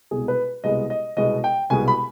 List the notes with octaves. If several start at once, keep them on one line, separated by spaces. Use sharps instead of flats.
C2 B2 G#3 B3 G#4
B4
C2 B2 G#3 B3 D#5
D#5
C2 B2 G#3 B3 D#5
G5
C2 B2 G#3 B3 G#5
B5